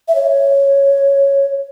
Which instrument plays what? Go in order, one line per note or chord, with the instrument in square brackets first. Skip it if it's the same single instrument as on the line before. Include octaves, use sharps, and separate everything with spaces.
[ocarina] E5
C#5